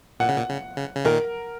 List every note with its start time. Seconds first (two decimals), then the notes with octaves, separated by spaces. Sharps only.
0.20 A#2 F#5
0.29 C#3
0.37 A#2
0.49 C#3
0.76 C#3
0.96 C#3
1.05 A#2 D#3 A#4